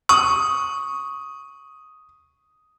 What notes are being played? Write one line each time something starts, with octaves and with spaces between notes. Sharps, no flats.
C#6 D#6